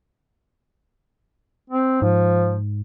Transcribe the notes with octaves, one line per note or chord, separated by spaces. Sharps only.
C4
G#2 F3